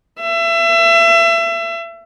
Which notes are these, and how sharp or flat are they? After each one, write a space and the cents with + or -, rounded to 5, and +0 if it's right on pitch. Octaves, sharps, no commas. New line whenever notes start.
E5 +30